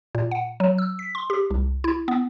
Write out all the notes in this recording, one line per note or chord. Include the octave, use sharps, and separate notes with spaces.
A#2
F#5
F#3
E6
B6
C6
G4
C2
E4
B3